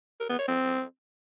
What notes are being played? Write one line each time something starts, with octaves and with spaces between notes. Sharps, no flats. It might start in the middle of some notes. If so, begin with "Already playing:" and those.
A#4
B3
C#5
C4